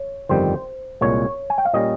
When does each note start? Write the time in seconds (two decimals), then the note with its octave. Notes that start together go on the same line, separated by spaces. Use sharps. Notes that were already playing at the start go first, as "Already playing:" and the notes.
Already playing: C#5
0.29 G1 F2 D#3 G3 C4 C5
1.01 C2 A#2 G#3 C#5
1.50 G#5
1.58 G5
1.65 F5
1.74 A#2 G3 C#4 D#5